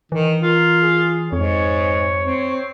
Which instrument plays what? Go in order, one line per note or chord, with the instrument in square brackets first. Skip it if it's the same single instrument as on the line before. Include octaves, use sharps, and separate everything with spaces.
[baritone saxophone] D#3 [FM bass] E3
[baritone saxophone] F4 [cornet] A#4
[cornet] G#4
[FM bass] F2 [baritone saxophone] G#2 [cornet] C#5
[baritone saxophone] C4